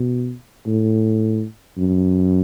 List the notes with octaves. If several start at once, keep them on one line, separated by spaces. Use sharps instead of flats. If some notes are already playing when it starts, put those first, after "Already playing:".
Already playing: B2
A2
F#2